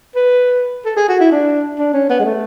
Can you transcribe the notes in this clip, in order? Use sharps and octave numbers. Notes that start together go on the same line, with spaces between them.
B4
A4
G#4
F#4
E4
D4
D4
C#4
B3
G#3
A3